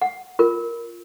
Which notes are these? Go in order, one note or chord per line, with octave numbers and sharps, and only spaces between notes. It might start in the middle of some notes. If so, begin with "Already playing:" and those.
F#5
F4 A#4